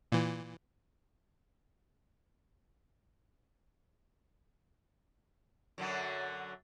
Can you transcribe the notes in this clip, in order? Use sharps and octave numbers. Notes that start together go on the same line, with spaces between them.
A#2 E3
F#2 D3 F#3